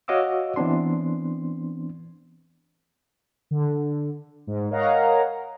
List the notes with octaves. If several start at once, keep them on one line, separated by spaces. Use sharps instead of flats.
F#4 C#5 D#5 F5 D6 E6
E3 B3 C4 D4 C6
D3
G#2
A#4 C#5 D#5 F5 F#5 A#5